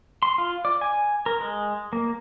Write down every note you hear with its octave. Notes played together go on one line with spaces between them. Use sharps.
C6
F4
D5
G#5
A#4
G#3
A#3